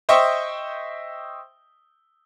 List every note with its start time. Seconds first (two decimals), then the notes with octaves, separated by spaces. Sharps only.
0.09 C5 D#5 E5 G5 C#6